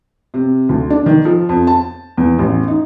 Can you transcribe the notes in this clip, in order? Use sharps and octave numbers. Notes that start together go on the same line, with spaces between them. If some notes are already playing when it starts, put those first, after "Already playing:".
C3
D2
D4
D#3
F3
F2
A5
E2
A1
D#4